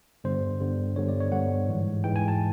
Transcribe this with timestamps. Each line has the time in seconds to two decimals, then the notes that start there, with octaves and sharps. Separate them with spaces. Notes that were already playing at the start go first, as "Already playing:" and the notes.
0.24 G2 D3 G3 B3 C5
0.60 G2 D3 G3 B3
0.96 G2 D3 G3 B3 C#5
1.09 D5
1.20 C#5
1.32 G2 D3 G3 B3 F#5
1.68 G#2 E3 G#3
2.04 G#2 E3 G#3 G5
2.16 G#5
2.28 A5